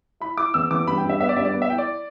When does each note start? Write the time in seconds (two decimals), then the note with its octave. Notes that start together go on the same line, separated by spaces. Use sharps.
0.20 E4 B5
0.37 E4 D6
0.54 E2 E6
0.71 E2 D6
0.87 G2 B5
0.98 G5
1.04 G2
1.09 E5
1.20 B3 E5
1.29 D5
1.36 G2 E5
1.45 D5
1.53 B3
1.62 E5
1.70 E4 G5
1.78 D5